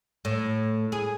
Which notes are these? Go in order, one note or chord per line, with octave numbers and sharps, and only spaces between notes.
A2
G#4